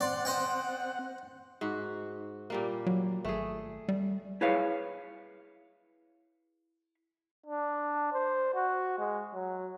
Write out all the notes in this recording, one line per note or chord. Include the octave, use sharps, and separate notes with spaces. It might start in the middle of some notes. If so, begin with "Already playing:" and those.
C4 D5 F#5 C6
C5 D#5 G5
G#2 F#4
A#2 G3 A#3
F#3
G#1 A3 G#4
G3
E4 G#4 B4 C#5 F5
D4
C5
F#4
G#3
F#3